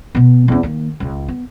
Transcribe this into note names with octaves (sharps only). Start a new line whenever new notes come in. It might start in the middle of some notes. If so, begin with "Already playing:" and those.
B2 B3
E2 C#4
D#3 A#3
C#2 C#3
B3